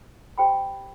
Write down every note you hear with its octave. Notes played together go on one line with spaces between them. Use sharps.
G4 C5 G5 B5